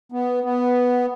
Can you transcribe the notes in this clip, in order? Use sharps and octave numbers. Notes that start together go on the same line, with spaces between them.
B3
B3